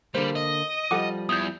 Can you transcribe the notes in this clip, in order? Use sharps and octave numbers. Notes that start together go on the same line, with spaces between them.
D3 G3 A#3 C5
D#5
F3 G3 A4 F#5 D6
E2 D#6 G6